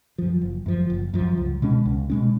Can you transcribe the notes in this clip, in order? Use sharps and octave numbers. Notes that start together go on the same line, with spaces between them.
F#2 F3
F#1
F#2 F3
F#1
F#2 F3
C#2
B2 G#3 C#4
C#2
B2 G#3 C#4